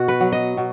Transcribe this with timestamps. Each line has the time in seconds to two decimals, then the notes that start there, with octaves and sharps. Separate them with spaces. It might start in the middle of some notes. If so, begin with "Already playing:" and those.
Already playing: B2 F#4
0.08 B4
0.20 F#3
0.32 D#5
0.57 B2